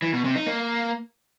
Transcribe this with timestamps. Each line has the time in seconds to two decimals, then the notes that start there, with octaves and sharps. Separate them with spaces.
0.02 E3
0.13 B2
0.24 C3
0.35 D#4
0.47 A#3